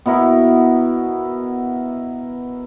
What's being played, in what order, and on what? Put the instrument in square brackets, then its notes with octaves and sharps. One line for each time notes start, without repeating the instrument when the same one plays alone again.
[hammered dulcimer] B2 B3 E4 A#4